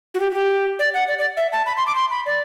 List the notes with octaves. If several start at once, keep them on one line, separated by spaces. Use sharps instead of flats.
F#4
G4
F#4
G4
D5
F#5
D5
D5
E5
A5
B5
C6
D6
C6
B5
D5